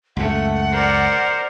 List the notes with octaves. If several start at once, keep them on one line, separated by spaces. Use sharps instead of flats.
C#2 F#2 A3 F#5
A#4 C5 D5